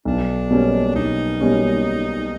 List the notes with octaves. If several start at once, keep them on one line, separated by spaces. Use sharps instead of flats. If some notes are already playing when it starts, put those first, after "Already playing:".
B1 D4
B2 G3 A#3 C#4
B1 D#4
B2 G3 A#3 C#4